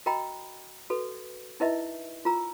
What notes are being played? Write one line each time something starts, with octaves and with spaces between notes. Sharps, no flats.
F#4 A#4 D#5 G5 A#5 B5
F#4 A4 B4
D#4 E4 A#4 B4 D#5 E5
F4 A#4 A#5 E6